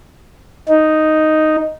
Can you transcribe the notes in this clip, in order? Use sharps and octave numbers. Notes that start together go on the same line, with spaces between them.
D#4